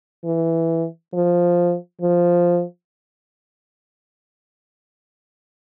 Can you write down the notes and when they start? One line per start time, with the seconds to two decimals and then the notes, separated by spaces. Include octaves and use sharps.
0.24 E3
1.13 F3
2.01 F3